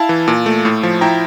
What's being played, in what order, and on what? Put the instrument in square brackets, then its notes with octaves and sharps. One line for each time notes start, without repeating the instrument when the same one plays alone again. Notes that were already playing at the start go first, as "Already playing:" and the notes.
Already playing: [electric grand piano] E4 F5 A5
E3
A#2
A3
A2
F3
E4 G5 A#5